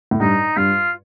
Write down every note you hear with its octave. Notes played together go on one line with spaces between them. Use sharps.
A2
G2 D#4
G2 F4